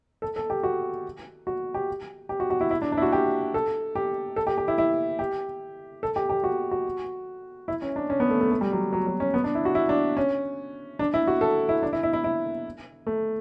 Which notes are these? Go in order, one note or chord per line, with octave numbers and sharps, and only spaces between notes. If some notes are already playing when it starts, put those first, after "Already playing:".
A4
A4
G4
F#4
F#4
G4
G4
F#4
F#4
E4
E4
D4
D4
E4
F#4
G4
A4
G4
A4
G4
G4
E4
E4
G4
A4
G4
G4
F#4
F#4
E4
C#4
D4
C#4
B3
A3
A3
A3
G3
F#3
F#3
F#3
C#4
B3
D4
E4
F#4
E4
D4
C#4
D4
E4
F#4
A4
E4
D4
E4
E4
E4
E4
A3